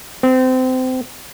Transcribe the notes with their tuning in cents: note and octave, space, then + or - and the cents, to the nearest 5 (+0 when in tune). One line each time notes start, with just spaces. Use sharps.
C4 -25